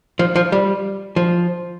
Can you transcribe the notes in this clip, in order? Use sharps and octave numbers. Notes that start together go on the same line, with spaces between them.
F3
F3
G3
F3